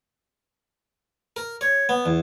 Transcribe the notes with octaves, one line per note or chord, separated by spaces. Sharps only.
A#4
C#5
B3
E2